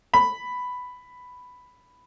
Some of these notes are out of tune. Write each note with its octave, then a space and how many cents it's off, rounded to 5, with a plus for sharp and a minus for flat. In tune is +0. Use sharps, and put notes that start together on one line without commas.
B5 +5